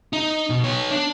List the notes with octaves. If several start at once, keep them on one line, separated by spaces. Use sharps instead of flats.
D#4
B2
B3 C#5
D4